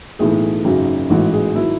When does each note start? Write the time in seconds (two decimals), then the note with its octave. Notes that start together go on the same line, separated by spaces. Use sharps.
0.19 B1 A2 E3 G#4
0.65 G#1 F#2 C#3 F#3
1.10 A1 G#2 E3 F#4
1.33 G#4
1.55 D#3 F#3 E4